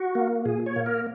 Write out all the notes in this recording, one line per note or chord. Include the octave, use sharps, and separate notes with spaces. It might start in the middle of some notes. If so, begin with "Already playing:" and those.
Already playing: F#4
A#3
A#2 G#4
C#5
A#3
A#4